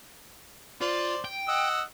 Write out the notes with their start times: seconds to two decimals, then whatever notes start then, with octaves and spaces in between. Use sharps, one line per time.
0.81 F4 C5 D5
1.25 G5
1.48 D#5 F#5 E6